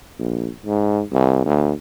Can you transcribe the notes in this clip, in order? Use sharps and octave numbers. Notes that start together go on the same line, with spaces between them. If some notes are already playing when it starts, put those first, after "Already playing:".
A#1
G#2
C2
D2